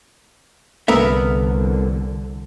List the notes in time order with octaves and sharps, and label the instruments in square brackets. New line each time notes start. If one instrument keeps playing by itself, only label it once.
[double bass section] C2 D3 [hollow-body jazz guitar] B3 A#4 E5